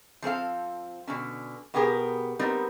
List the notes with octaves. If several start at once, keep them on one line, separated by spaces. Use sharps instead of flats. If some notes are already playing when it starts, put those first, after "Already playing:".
F3 C4 A4 F5
B2 D3 C#4
B2 B3 G4 G#4 A#4
G3 B3 C4 D#4 A#4